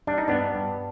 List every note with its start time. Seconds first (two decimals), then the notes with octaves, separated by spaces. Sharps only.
0.07 G3 D4
0.18 D#4
0.28 G2 B3 D4
0.55 G2